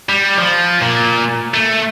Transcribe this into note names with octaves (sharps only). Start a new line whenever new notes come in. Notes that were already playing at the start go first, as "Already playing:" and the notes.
G3
F3
A#2
A3